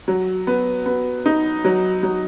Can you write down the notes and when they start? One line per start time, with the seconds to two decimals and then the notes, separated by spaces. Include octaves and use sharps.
0.08 F#3
0.47 B3
0.86 B3
1.26 D#4
1.65 F#3
2.03 F#3